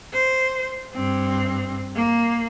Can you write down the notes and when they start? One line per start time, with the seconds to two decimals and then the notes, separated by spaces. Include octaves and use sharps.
0.13 C5
0.93 G2 C4
1.95 A#3